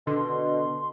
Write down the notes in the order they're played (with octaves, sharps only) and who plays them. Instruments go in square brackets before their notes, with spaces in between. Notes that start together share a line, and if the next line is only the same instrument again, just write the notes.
[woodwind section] B2 [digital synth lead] D3 [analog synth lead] C6